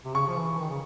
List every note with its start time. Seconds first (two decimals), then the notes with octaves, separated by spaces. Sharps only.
0.05 C3
0.14 C#3 C#6
0.28 F3
0.37 E3
0.59 D#3
0.70 C#3